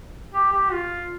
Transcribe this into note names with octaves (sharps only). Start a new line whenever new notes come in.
G4
G4
F4